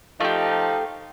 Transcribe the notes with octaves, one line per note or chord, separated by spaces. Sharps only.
F3 A3 D#4 G4 F5